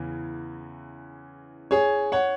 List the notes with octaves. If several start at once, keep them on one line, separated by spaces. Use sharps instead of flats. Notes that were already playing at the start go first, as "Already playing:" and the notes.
Already playing: E2 C#3 E3
G#4 C#5
C#5 F#5